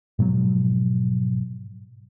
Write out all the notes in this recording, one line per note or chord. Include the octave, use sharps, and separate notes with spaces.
G#2 B2 F3 F#3